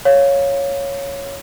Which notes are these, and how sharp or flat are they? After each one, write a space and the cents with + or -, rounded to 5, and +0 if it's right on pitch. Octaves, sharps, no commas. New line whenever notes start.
C#5 +0 F5 +0